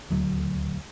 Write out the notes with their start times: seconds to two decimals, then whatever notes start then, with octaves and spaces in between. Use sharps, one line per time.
0.10 D#1 D2 F#3